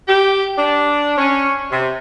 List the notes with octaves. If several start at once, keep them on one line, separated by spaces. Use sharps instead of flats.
G4
D4
C#4
C3